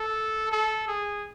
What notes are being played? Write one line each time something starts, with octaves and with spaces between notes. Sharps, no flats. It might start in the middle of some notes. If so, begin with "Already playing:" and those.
Already playing: A4
A4
G#4